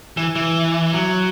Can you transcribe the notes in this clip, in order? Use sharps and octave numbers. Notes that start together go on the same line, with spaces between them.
E3
E3
F#3